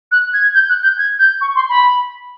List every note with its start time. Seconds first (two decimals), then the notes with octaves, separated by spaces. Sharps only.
0.11 F#6
0.33 G#6
0.54 G6
0.69 F#6
0.83 G6
0.98 G#6
1.19 G6
1.41 C#6
1.55 C6
1.69 B5